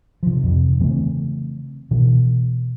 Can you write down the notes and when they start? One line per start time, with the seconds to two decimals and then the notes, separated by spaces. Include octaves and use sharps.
0.23 C3 F3
0.43 F2 C3
0.80 C#3 E3 A3 C4
1.91 B2 E3